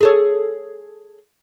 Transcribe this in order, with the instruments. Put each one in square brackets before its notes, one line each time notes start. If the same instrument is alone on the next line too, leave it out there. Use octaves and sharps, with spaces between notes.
[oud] G#4 A4 C#5